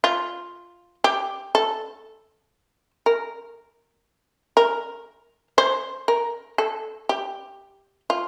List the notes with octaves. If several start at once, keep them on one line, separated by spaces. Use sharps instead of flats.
F4
G4
A4
A#4
A#4
C5
A#4
A4
G4
F4